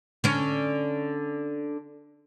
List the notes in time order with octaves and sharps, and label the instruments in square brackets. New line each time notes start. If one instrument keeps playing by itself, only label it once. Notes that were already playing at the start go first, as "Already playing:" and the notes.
[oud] D3 C#4